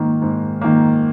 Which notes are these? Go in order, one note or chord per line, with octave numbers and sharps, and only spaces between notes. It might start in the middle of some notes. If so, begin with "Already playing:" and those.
Already playing: G#2 D#3 A#3
G#2
D#3 A#3